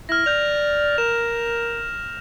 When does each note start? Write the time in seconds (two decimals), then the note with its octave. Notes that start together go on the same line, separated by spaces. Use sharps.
0.09 E4 F6 A#6
0.26 D5 G6 F7
0.98 A#4 E7